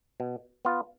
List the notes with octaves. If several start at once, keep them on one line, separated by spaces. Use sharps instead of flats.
B2
B3 F4